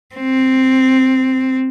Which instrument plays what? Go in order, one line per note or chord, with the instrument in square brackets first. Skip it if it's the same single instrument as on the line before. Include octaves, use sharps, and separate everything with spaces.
[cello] C4